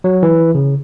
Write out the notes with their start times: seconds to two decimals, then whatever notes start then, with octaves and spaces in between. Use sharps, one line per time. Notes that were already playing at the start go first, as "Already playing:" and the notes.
0.04 F#3
0.23 E3
0.55 C#3